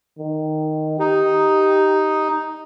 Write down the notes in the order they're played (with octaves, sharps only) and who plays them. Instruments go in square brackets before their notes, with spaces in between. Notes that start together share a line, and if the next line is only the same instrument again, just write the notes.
[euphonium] D#3
[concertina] D#4 [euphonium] G4